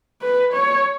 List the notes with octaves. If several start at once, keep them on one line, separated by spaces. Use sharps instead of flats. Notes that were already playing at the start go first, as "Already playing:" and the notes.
B4
C#5